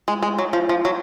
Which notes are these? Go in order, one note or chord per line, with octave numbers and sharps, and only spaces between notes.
G#3
G#3
F#3
F3
F3
F#3